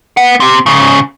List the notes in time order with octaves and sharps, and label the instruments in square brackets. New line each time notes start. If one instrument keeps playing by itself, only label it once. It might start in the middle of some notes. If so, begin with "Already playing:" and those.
[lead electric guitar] B4 F#5
C4 G4
G#2 C#3